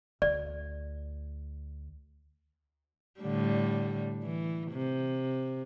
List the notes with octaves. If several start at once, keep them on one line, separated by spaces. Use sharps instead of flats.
D2 D5
A2 D3 G3
E3
C3